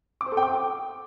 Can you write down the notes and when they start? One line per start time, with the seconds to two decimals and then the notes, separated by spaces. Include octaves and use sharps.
0.21 D6
0.26 C5
0.32 A4
0.37 G5
0.43 D6